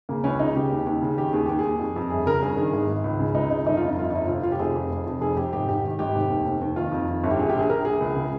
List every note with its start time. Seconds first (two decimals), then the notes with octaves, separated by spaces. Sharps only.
0.09 C#3 A#3
0.24 C#2 C#4
0.39 C#3 D#4
0.56 C#3 G4
0.71 D#2
0.87 D#2
1.02 C#3
1.17 D#3 G4
1.33 D#2 G#4
1.46 D#2 G4
1.59 G#4
1.64 D#2
1.79 F2
1.96 F2
2.10 G1 G#4
2.26 C#3 A#4
2.42 G2 G#4
2.57 D#3 G#4
2.73 G#1 G#4
2.89 G#1
3.04 C#2
3.19 C#3
3.34 C#2 D#4
3.50 C#3 D#4
3.66 G1 D#4
3.77 F2 F4
3.87 D#4
3.97 G1 F4
4.10 G1 D#4
4.28 F1 F4
4.43 F1 F4
4.52 G4
4.59 F1 G#4
4.75 F2
4.90 F1
5.06 F2
5.21 F1 G#4
5.36 F1 G4
5.53 G#1 G4
5.69 G#2 G4
5.84 D#3
5.99 G#1 G4
6.15 F1
6.30 D#2
6.46 F1
6.61 D#2
6.76 D#3 F4
6.92 F2
7.08 D#3
7.23 G1
7.31 G4
7.39 A#1 G#4
7.49 G4
7.55 A#1 G#4
7.70 A#1 A#4
7.85 A#1 G#4
8.00 C#2
8.16 C#3